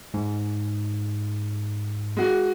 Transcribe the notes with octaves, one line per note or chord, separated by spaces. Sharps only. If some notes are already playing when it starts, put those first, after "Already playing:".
G#2
G#3 F#4